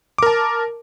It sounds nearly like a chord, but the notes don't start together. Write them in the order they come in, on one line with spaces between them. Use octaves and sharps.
D6 A#4 A5